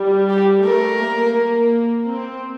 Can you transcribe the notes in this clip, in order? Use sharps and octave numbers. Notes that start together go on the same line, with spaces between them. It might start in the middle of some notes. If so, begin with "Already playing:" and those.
Already playing: G3
G4
A3 A#4
A#3
C4